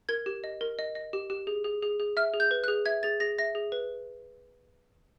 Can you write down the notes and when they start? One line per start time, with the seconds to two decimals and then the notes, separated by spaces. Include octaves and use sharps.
0.09 A#4 G#6
0.26 G4
0.44 D#5
0.61 A#4
0.79 D#5
0.95 D#5
1.13 G4
1.30 G4
1.47 G#4
1.65 G#4
1.83 G#4
2.00 G#4
2.17 E5 F6
2.34 G#4
2.40 G6
2.51 B4
2.64 F#6
2.68 G#4
2.86 E5 G#6
3.03 G#4 A6
3.20 G#4 A#6
3.38 E5 A#6
3.55 G#4
3.72 B4